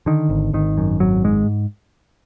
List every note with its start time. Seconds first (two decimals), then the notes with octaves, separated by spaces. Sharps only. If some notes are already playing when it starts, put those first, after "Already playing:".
0.06 D3 D#3
0.29 G#1
0.53 G#1 D#3
0.78 F#2
1.00 G#1 F#3
1.24 G#2 G#3